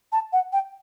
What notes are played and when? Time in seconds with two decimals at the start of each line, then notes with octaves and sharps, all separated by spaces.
0.12 A5
0.33 F#5
0.53 G5